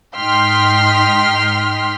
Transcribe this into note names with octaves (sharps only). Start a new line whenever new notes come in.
G#2 D#4 G5 C6 F6 B6